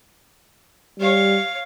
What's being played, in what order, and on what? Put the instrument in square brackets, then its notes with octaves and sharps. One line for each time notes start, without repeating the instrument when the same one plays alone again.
[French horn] G3 [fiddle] C#5 F5